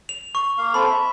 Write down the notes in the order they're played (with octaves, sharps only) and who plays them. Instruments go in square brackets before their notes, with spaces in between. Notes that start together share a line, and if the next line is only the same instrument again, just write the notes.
[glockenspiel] F7
C#6
[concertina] A#3 F5
[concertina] C4 A4 [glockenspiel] B5
[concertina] E5